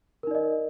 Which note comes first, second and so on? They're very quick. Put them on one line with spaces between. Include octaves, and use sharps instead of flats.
A#4 D#4 D5 D#5